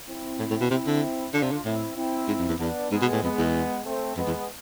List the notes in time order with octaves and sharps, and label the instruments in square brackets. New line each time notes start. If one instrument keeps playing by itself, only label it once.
[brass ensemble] C4 E4
[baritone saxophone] A2
A2
B2
[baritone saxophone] C3 [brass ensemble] C4 E4
[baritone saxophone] D3
[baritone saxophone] D3 [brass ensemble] D4 F4
[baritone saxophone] C3
D3
[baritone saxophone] A2 [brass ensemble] C4 E4
[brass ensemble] C4 E4
[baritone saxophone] G#2
F2
E2
[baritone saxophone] E2 [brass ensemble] B3 D4
[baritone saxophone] G#2 [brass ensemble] G#3 B3
[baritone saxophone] B2
A2
[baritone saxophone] F2 [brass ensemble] G#3 B3
[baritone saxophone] E2
[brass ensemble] A3 C4
[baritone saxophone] F2 [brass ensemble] G#3 B3
[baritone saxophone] E2